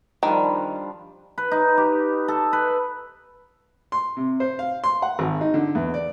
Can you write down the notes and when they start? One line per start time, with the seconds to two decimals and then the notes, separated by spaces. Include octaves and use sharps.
0.23 D#3 F3 G3 D4
1.38 B4
1.52 D#4
1.77 G4
2.28 A4
2.53 B4
3.92 C6
4.17 C3
4.40 C5
4.59 F5
4.84 C6
5.02 F#5
5.19 G#1
5.41 D#4
5.54 D3
5.75 E2
5.94 D5